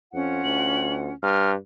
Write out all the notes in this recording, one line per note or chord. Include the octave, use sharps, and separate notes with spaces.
F2 C#4 F4 F#5
D2 F#7
G2 F6